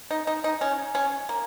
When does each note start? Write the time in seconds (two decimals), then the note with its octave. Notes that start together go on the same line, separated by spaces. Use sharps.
0.11 D#4
0.27 D#4
0.44 D#4
0.61 C#4
0.95 C#4
1.29 A#3